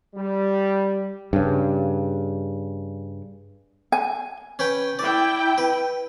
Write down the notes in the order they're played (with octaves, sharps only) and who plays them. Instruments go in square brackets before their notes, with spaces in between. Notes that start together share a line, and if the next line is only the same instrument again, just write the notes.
[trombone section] G3
[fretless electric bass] G2 C#3
[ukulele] G#5
[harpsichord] C#4 B4 G5
[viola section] E4 G5 [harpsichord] D5
[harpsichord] B4